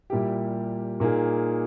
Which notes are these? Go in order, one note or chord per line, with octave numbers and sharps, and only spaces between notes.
A#2 G3 A#3 E4 G4
A#2 A#3 D#4 G#4